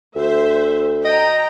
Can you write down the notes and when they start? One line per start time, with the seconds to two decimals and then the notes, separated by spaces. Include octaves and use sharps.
0.16 D2 C5 E5
1.05 D#5 G5 A#5